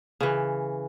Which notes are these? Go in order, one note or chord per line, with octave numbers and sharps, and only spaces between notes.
C#3 E3